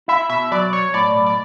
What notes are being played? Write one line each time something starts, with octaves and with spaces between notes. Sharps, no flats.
E4 E5
B2 E5
F#3 D5
B1 C#5
A2 D5
B1
D5